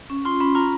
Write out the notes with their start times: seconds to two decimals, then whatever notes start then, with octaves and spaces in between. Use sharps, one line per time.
0.10 C#4
0.25 F4 C6
0.40 C#4 B5
0.55 F4 A#5